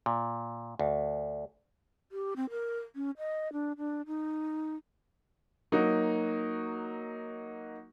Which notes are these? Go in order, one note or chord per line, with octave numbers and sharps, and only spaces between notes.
A#2
D2
G4
C4
A#4
C#4
D#5
D4
D4
D#4
F#3 A#3 D#4 F#4